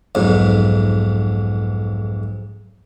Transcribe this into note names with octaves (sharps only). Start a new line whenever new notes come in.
B1 F2 G#2